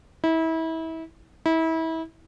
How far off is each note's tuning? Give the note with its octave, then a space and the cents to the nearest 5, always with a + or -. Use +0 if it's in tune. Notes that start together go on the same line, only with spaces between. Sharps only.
E4 -30
E4 -30